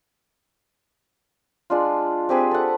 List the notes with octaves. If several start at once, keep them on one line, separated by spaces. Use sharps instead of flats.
G#3 D4 F4
C4 G4 G#4 B4
A4 F#5